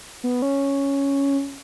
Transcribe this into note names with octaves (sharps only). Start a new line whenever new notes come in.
B3
C#4